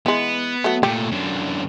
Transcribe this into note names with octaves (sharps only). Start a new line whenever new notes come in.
E3 G#3 B3
F#3 A3
A#2 A3 G4
F#2 D3